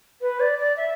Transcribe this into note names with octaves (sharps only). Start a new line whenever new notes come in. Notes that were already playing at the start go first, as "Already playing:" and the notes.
B4
D5
D5
E5